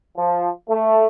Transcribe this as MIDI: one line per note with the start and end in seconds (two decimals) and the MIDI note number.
0.16 0.48 53
0.69 1.06 57